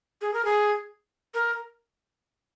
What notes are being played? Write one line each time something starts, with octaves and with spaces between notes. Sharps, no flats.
G#4
A#4
G#4
A#4